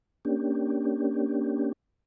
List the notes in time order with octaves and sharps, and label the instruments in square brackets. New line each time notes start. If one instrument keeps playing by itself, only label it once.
[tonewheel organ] A#3 C#4 D4 G4